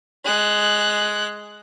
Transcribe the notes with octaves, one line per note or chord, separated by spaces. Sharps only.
G#3 F#6